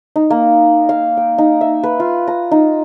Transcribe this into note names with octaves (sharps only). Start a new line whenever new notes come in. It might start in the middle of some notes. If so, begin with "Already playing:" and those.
D#4
A#3
F5
G5
D#4
E5
B4
F4
A#5
D#4